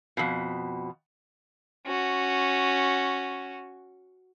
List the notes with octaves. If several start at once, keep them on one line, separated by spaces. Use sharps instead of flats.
F2 B2
C#4 F#4